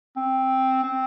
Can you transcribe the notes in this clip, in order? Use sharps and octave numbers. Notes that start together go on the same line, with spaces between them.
C4
C4